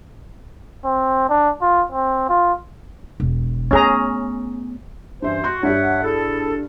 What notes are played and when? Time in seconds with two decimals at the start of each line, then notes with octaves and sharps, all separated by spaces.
0.85 C4
1.30 D4
1.62 F4
1.92 C4
2.29 F4
3.20 E1
3.71 A3 B3 C#4 G#4 A#5
5.22 G2 E3 C#4 C5 E5
5.44 F#4 C6 G6
5.63 G2 G3 C#5 E5 F#5
6.04 E4 G#4 A4